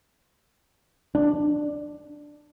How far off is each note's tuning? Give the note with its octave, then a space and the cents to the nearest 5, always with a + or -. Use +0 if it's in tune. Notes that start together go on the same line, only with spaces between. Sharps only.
D4 +10